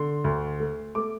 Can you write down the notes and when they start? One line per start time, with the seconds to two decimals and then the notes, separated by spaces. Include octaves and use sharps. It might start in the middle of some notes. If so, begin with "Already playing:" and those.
Already playing: D3 C6
0.24 D2
0.60 A3
0.95 A3 D6